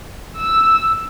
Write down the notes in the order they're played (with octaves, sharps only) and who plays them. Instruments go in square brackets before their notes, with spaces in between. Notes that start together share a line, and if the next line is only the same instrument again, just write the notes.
[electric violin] E6